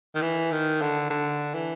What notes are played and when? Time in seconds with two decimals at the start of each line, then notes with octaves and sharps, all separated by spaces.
0.15 D#3
0.22 E3
0.52 D#3
0.81 D3
1.10 D3
1.54 E3